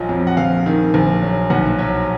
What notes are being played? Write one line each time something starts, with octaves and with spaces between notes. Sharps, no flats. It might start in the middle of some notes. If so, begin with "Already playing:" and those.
Already playing: A#1 F3 F#3 D#5
F2
F#5
A#1 F5
D#3
A#1
F#3
B1 F#5
F#3